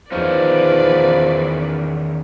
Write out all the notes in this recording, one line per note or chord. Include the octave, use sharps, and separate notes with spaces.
E2 D#3 F3 C#4 D#4 B4 D5